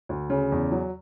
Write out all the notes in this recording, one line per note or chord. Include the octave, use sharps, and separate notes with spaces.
D2
C#3
E2
F#3